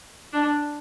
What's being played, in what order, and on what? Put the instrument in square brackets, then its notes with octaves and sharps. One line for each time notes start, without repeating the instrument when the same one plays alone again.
[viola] D4